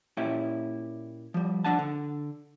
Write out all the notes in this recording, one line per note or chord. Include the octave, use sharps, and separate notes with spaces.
A#2 C#4 E4 G4
F3 G3
F3 F#3 D4 F#5 A5
D3